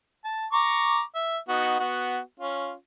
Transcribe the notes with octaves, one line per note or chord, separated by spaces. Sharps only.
A5
A#5 C#6 D6
E5
B3 D#4 F#4
B3 F#4
C#4 F4